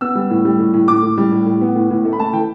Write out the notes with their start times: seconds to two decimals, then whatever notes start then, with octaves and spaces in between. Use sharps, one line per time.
0.01 B3 E6
0.15 G3
0.30 A2
0.45 G3
0.59 A2
0.74 A2
0.88 A2 D6
1.03 A2
1.18 G3
1.32 A2
1.46 A2
1.61 B3
1.75 A2
1.90 A2
2.05 A3
2.13 B5
2.19 A3 A5
2.33 E3 G5